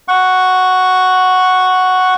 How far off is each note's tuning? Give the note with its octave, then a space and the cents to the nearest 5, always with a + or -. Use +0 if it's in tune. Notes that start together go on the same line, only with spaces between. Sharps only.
F#5 +0 C#6 +0